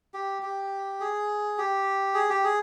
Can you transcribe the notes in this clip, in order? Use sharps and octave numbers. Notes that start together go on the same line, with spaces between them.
G4
G4
G#4
G4
G#4
G4
G#4